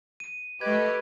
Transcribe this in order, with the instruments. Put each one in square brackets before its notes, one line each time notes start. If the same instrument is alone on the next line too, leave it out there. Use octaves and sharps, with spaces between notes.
[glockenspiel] D#7
[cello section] A3 G4 [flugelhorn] B4 [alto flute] D#5 [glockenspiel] G#6